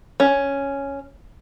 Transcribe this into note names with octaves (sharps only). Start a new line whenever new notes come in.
C#4